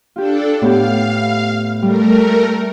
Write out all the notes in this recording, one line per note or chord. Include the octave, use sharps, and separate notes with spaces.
D4 F4 G4 A4
A2 B3 G4 F5
G3 A3 A#4